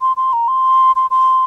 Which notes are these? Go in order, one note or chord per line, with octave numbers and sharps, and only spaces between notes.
C6
C6
A#5
C6
C6
C6